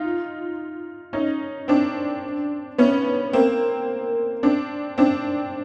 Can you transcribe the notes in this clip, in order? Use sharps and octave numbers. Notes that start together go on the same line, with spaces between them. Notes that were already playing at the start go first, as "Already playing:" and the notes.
Already playing: D#4 F4
C#4 D#4
C4 D4
B3 C#4
A#3 C4
C4 D4
C4 D4